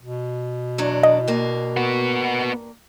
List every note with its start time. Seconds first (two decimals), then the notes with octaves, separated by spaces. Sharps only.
0.02 B2
0.78 E2 F#3 D4
1.03 D#5
1.28 G2 A#3
1.77 B3 F#4